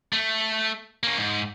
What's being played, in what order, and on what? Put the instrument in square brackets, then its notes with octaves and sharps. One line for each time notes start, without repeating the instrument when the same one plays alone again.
[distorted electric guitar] A3
A#3 C#4
G#2